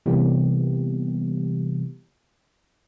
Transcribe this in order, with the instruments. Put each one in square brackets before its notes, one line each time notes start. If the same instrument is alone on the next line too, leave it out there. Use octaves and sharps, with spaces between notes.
[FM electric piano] C3 E3 G3 A#3 B3 G4